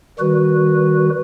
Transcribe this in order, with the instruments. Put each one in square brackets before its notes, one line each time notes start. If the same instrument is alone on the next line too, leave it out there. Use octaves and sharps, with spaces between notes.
[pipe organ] D#3 G3 F#4 B4